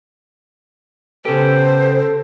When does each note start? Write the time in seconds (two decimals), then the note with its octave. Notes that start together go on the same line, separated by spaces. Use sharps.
1.25 C#3 B3 G4 A4 C5